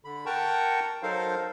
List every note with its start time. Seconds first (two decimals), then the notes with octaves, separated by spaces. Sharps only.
0.04 D3 B5
0.26 A#4 F#5 G5 A5 A#5 C#6
1.03 F#3 D#4 A4 A#4 C5 F5